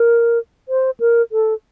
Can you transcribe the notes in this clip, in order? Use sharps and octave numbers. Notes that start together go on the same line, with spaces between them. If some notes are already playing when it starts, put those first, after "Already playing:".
Already playing: A#4
C5
A#4
A4